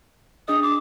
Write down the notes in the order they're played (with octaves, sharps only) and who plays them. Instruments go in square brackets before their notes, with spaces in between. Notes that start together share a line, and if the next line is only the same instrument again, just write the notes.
[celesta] D4 G#4 D#5 [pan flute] D#6
[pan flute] D6